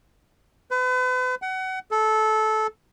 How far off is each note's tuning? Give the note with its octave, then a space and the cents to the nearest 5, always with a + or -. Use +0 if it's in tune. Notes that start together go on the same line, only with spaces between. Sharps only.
B4 +40
F#5 +30
A4 -15